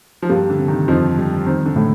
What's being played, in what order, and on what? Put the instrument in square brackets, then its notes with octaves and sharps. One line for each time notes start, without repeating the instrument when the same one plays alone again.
[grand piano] F3
[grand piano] G2 G3 [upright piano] A#3
[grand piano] D3
[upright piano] C3
[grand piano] D#3
[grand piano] F2 F3 [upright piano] D#4
[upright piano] G3
[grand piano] D#3 [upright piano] C4
[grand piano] D3
[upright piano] A2